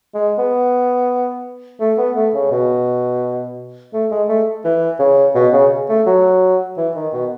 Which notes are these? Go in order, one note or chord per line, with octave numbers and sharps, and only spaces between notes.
G#3
B3
A3
B3
A3
C#3
B2
A3
G#3
A3
E3
C#3
B2
C#3
A3
F#3
E3
D#3
B2